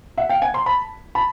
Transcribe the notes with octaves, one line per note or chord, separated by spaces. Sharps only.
E5 F#5
F5 G5
F#5 G#5
A#5 C6
A5 B5
A5 B5